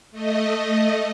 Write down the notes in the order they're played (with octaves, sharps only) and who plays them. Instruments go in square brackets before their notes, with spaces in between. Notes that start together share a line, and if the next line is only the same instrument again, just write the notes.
[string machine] A3 D#5